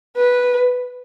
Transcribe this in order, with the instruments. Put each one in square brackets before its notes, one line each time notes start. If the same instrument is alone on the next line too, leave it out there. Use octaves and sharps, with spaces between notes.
[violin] B4